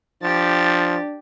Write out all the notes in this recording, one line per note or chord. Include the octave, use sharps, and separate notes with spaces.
F3 D4 G4 A6